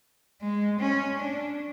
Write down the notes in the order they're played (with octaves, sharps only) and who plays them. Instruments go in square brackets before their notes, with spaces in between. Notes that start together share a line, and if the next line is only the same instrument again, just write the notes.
[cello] G#3
C#4
D4